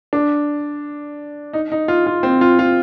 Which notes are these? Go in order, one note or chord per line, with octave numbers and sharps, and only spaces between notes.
D4
D#4
D#4
F4
F4
C4
F4
F4